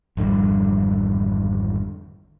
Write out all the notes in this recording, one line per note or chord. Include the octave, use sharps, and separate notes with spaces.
G#1 F2 D3 G3